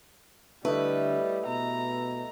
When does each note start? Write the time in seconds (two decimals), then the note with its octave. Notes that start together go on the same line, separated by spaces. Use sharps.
0.65 D3 G3 A3 E4 B4 D#5
1.47 B2 A#5